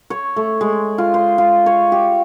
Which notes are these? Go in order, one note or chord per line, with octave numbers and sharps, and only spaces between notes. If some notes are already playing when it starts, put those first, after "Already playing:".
C#5
A3
G#3
F4
C5
F4
C#5
G4